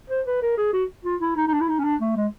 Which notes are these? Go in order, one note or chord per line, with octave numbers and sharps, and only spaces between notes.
C5
B4
A#4
G#4
F#4
F4
E4
D#4
D#4
D4
E4
D#4
C#4
D4
A3
G#3